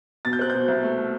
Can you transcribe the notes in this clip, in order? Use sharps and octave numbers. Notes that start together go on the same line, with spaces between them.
B2 A6
G6
C4 F#6
B2 G6
C2
A3